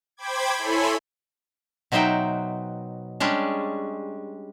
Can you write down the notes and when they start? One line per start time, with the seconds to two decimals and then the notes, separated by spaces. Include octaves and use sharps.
0.17 C5 G5 B5 D6 G#6
0.58 E4 A4 C#5 G#5 B5 C6
1.92 B2 F#3 D#4 C5 E5 G5
3.20 G3 G#3 C#4 D4